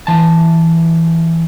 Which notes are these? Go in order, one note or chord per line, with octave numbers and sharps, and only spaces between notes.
E3 A5